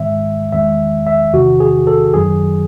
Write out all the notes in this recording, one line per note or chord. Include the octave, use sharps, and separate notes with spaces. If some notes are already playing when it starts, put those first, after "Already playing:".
Already playing: G#2 D#3 G#3 E5
E2 D#3 G#3 E5
E5
E2 C3 D#3 F#4
G#4
A4
F#2 D#3 F#3 G#4